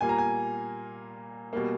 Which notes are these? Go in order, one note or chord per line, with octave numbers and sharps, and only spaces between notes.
A#2 G3 A#3 G#5
A#5
G#5
B2 G3 A#3